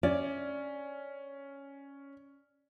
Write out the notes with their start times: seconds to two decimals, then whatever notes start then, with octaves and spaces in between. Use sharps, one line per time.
0.03 C#4 D5